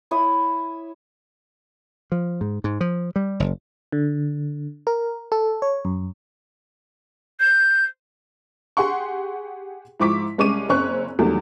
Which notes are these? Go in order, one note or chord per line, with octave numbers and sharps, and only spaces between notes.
E4 C#5 E5 D#6
F3
G#2
G#2
F3
G3
F#1
D3
A#4
A4
C#5
F#2
G6
G4 G#4 F#5 C6 C#6
G#2 F3 E4 C#6 D6 B6
C2 G#3 C#4 C#6 D6 D#7
F#1 C4 C#4 C#6 F#6
A#1 E2 D#3 F#3 G3 A3